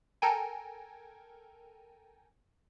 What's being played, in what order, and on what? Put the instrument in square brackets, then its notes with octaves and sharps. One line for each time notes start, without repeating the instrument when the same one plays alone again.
[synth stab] A4 A#4 G5 G#5